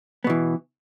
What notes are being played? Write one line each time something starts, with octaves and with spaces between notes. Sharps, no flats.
B2 E3 B3